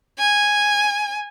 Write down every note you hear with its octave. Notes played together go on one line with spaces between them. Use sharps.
G#5